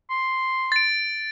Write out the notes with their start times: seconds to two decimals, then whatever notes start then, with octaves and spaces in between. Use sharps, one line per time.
0.10 C6
0.72 A6 D7